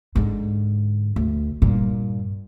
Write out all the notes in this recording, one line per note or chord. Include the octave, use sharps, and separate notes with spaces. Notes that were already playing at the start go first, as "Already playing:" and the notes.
G#2 D3
D2
G2 A#2